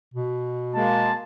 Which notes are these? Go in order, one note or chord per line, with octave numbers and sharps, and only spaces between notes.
B2
G#3 A#3 A5